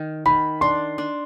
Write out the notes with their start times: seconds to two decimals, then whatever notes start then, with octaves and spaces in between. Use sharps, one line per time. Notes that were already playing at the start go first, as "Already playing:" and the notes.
Already playing: D#3
0.26 D#3 B5
0.61 D4 C6
0.98 D4